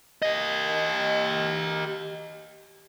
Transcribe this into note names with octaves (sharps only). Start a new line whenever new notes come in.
G4 D#5